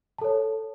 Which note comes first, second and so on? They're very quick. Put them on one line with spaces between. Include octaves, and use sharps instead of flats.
A5 A4 C#5